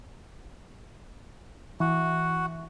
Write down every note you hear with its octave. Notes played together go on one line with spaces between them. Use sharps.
E3 F#4